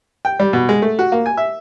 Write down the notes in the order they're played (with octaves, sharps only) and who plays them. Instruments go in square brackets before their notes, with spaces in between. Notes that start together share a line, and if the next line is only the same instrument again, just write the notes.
[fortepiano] G5
G3
B2
G#3
A3
F#4
A#3
G#5
E5